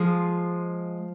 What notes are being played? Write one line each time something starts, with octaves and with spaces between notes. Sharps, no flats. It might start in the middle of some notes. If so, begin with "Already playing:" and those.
Already playing: F3 G#3